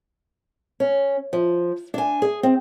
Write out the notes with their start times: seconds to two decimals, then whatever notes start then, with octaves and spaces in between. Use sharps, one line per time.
0.80 C#4
1.33 F3
1.94 D4 G#5
2.22 G#4
2.43 C4